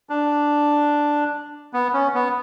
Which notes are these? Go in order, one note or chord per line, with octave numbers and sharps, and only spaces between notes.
D4
B3
C#4
B3